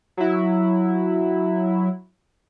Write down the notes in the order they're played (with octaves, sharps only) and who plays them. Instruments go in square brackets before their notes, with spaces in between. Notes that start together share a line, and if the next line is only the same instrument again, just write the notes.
[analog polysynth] F#3 E4